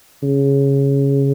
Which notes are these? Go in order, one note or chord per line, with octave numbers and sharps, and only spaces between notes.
C#3